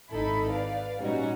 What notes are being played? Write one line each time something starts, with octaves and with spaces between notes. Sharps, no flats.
G#1 D#4 E4 A4 B5
B4 D5 F5
A#2 G3 C#4 D#4 F#4